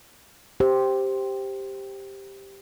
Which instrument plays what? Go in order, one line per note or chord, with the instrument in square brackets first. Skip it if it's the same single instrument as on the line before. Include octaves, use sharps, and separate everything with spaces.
[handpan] G4 C5